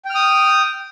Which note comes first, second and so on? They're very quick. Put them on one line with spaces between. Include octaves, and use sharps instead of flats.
G5 F6 D#6